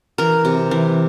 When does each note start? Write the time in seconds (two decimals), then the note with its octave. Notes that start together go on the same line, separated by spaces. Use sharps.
0.18 E3 A#4
0.45 C3
0.71 E3